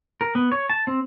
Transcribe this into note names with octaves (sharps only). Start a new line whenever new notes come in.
A#4
B3
C#5
A5
C4